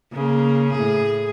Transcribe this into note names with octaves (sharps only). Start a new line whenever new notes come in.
C#3 A#3
A2 G#4